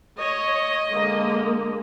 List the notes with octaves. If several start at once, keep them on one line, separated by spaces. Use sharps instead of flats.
C#5 D#5
D3 G#3 A#3